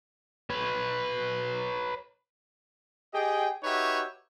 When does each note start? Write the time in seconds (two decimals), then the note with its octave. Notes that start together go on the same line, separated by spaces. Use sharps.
0.50 B4 C#5
3.13 G4 G#4 D#5 G5
3.63 D#4 F#4 G4 B4 C#5 E5